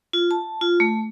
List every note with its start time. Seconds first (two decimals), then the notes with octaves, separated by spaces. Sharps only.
0.13 F4
0.31 A5
0.61 F4
0.80 A3